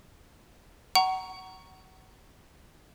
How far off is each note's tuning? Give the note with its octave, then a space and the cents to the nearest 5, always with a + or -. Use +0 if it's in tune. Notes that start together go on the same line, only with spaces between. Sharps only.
F#5 +25 A#5 +0 C#6 +0